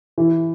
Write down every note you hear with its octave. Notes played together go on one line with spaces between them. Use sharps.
E3